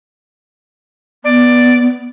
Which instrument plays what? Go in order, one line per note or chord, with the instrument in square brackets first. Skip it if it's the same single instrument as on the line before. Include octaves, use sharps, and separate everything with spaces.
[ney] B3 [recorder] D5